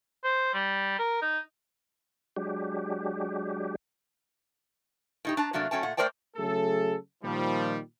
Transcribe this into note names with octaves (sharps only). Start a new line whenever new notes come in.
C5
G3
A#4
D#4
F#3 G#3 D4 G4
A2 D#4 G4
D4 A5 A#5
C3 F#3 A3 A#3 D4
F#3 A3 C#4 G5 A5
A#2 A3 F#5
A3 A#4 C5 D5 G5 A5
C#3 F#3 A3 G#4 A4
A#2 D#3 F3 G3